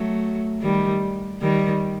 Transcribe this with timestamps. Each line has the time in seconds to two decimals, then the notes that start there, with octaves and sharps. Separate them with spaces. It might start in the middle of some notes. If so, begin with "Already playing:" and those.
Already playing: F#3 A3
0.62 D#3 G3
1.42 D#3 G3